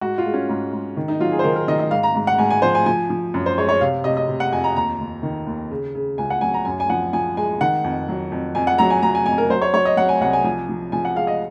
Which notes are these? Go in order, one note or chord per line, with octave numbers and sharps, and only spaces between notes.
G#2 F#4
F4
G#3
C#4
G#2
G#2
D#3
D#4
F#3 F4
G#4
C5
D#3 A#4
A#4
D#3 D#5
D#5
G#2 F5
A#5
G#2
F#5
G#2 G#5
G#5
F3 C5
G#5
F3 G#5
F3
F#2
C5
G#3 C#5
C#5
C3 F5
C3 D#5
D#5
C3
F#5
F2 G#5
A#5
D#2 A#5
D#2
D#3
D#2
C#3
C#3
C#2 G#5
F#5
F#3 G#5
A#5
F#2 G#5
G#5
F3 F#5
F3 G#5
G#3 G#5
D#3 F#5
F2
F#3
F2
F2 G#5
F#5
F#3 A#5
G#5
F#3 A#5
G#5
F2 G#5
A#4
F#3 C5
C#5
F#3 C#5
D#5
F#3 F#5
G#5
C2 F#5
G#5
F3 G#5
F3
F3 G#5
F#5
G#3 F5
D#5